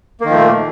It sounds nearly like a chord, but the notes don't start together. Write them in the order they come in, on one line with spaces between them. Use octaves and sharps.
A#3 D#3 F3 A3 A#2